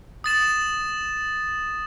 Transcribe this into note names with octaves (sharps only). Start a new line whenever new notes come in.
D#6 A6 E7